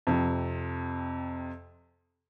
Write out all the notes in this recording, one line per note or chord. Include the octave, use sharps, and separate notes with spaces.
F2 C3